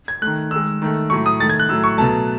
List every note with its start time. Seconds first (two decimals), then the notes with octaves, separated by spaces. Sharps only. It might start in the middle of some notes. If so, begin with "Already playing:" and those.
0.08 G#6
0.22 D#3 A3 F#6
0.51 D#3 G#3 E6
0.82 D#3 A3
1.10 A2 F#3 A3 C#6
1.26 D#6
1.40 D#3 A3 A6
1.50 G#6
1.60 F#6
1.69 A2 F#3 A3 E6
1.84 C#6
1.98 B2 F#3 A3 A5